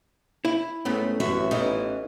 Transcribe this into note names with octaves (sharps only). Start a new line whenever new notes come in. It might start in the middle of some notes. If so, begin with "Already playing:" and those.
E4
G#2 A3 B3 C#4
A1 F#2 F#4 E5
E3 B3 C#4 D#4